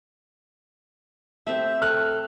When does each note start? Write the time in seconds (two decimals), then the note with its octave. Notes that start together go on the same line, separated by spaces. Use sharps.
1.47 A3 C4 G4 E5
1.82 A4 F6 F#6